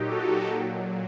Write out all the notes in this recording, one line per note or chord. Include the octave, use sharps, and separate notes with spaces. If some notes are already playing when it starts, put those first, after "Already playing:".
Already playing: A#2 F#3 D#4 G4
F#4 A4
A#2 F#3